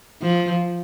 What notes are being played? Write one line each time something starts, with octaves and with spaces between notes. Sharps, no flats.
F3